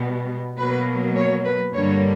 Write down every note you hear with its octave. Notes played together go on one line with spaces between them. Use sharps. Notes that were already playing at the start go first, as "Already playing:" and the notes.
Already playing: B2 G3 B3
B2 F#3 A#3 B4
C#5
B4
G2 D3 G3 A#3 C#5